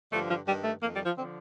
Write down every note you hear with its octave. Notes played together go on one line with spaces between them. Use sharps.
G2 D3 F3 A3
F3
G2 D#3 G3
A3
F2 D#3 A#3
G3
F3
D3 F3 C4